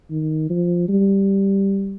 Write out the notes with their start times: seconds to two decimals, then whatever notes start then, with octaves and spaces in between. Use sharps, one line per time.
0.10 D#3
0.50 F3
0.89 G3